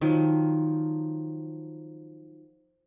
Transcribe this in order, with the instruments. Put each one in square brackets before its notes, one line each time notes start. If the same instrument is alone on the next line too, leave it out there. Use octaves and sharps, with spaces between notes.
[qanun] D#3 F3 F#3